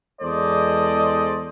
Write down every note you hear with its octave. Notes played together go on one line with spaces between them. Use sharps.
E2 G#3 A4 C5 D5 D#5